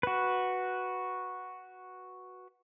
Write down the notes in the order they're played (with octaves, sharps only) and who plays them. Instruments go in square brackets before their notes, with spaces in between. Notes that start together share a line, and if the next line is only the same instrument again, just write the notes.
[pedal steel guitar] F#4 B4